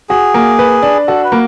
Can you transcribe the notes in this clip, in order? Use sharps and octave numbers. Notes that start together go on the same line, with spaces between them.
F#4 G#4
A#3
B4
D4
F#4 A4
B4
A#3